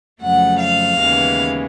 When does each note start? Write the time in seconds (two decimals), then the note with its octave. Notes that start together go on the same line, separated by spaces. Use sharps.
0.21 F2 C#3 F#3 A3 F#5
0.60 F5
1.00 D#2 C#3 E3 G#3 B3